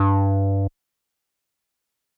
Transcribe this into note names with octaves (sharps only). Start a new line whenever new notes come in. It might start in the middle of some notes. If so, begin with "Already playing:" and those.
Already playing: G2